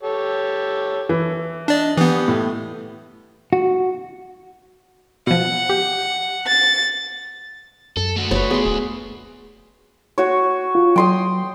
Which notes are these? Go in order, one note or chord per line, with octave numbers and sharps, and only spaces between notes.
G4 A4 C#5
E3
D4 D5 D#5 A5
E3 B3 G4 B4 D#6
A2
F#4
B2 F3 F#5
G4
A6
F#2 A4
A3 F#4
F#1 B4 C#5
B3 G#4 C6
D1
F#4 C#5
F4
F#3 G5 C6 D#6